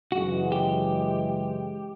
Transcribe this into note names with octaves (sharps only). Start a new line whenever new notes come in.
F#2 C#3 E3 G#3 F#4
G4